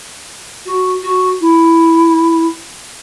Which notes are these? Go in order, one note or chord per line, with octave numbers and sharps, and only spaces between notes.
F#4
F#4
E4